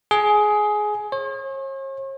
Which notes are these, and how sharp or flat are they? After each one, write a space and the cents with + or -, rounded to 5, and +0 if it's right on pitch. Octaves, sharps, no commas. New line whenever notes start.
G#4 +15
C#5 -45